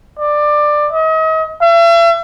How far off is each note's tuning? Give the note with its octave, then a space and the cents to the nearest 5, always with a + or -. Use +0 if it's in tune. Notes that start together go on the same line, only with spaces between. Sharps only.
D5 +15
D#5 +40
E5 +40